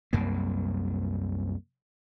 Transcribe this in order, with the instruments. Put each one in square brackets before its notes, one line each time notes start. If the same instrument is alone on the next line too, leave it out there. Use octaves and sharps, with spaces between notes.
[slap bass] C2 F#2 A#3